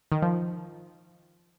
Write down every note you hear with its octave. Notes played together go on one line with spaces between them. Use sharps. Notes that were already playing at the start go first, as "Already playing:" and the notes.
D#3
F3